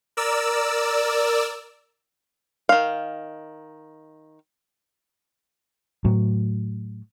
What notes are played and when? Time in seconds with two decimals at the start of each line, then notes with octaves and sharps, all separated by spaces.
0.17 A#4 D5 E6
2.69 D#3 F5
6.05 A2 F#3